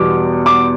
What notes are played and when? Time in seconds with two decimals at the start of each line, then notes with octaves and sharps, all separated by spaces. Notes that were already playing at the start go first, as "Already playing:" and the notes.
Already playing: E2 B2 G3 B3 D6
0.46 D6